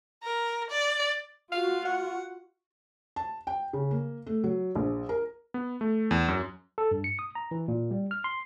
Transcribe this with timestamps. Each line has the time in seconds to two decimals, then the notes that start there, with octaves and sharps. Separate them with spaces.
0.23 A#4
0.71 D5
1.52 F4 F#4 F5
1.85 F#5
3.16 A5
3.47 G5
3.73 C#3
3.91 A#3
4.26 A3
4.44 F#3
4.75 A#1
5.09 A#4
5.54 B3
5.81 A3
6.11 E2
6.28 F#2
6.78 A4
6.91 G2
7.04 C#7
7.19 D#6
7.35 A#5
7.51 E3
7.68 A#2
7.91 G3
8.11 F6
8.24 C6